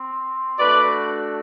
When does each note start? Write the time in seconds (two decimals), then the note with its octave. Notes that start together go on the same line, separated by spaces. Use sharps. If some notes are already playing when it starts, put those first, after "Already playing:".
Already playing: C4
0.58 A3 D4 F#4 B4 D5